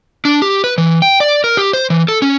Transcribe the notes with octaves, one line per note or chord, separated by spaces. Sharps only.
D4
G4
B4
E3
G5
D5
A#4
G4
C5
E3
A4
C#4